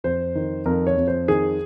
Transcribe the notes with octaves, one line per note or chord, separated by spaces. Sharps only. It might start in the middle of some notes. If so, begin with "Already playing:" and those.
F2 C5
D#3
F2 A#4
C#5
F2
C5
D#3 G#4